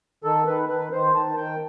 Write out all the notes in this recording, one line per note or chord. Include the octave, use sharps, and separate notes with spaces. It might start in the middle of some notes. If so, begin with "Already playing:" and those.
D#3 A4
D#3 B4
D#3 B4
D#3 C5
D#3 A5
D#3 G5